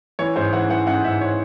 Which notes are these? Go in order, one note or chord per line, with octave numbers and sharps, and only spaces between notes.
E3 C#5
G#2 C5
E3 F#5
E3 F#5
G#2 F#5
G#2 E5
C#5